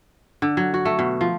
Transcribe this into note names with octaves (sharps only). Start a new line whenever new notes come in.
D3
F#3
F#4
A3
B2
F3